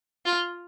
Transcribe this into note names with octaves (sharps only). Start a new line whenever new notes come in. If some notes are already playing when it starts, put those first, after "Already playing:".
F4